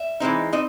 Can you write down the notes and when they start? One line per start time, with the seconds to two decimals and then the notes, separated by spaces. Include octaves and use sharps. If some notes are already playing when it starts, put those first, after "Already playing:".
Already playing: E5
0.20 E3 G#3 C4 D#4
0.53 C4 D#4 D#5